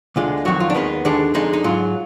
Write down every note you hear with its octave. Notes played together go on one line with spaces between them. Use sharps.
D2 D3 G#3 F4
F2 D#3 F#3 F#4
F4
D4
D#2 D#3 G#3 B3
D#2 D3 G#3 D4
F2 D3 G#3 D#4
D#4
G#2 F#3 F4